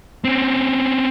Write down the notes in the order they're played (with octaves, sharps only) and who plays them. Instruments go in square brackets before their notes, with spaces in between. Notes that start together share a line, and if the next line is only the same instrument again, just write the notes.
[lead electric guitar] C4 C#4